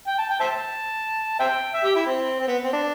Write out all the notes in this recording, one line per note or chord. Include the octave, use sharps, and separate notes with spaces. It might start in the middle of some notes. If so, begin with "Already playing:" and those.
G5
A5
G5
C5 E5 A5
C5 E5 G5
E5
G4
E4
C4
C4
B3
C4
D4